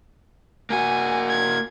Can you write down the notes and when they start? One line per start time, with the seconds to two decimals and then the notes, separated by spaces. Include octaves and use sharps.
0.70 A#3 F#4 G#5
1.29 G#6